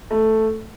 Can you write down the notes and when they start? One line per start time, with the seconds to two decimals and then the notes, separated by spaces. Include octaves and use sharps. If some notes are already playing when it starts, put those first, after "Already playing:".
0.11 A3